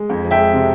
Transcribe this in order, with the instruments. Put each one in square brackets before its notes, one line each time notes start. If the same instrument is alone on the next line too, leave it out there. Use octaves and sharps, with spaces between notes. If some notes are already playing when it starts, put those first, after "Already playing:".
Already playing: [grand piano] G#3
F2
F3
E5 G5
G#3
C3